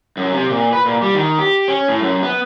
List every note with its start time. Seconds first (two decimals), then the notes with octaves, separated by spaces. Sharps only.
0.17 F#2
0.33 C3
0.50 A#2
0.73 B4
0.85 A#2
1.02 G3
1.14 D#3
1.39 G4
1.68 C#4
1.88 A2
2.00 F#2
2.22 B3